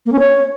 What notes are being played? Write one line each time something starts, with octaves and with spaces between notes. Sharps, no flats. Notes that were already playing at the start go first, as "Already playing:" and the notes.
A#3
C#4
C#5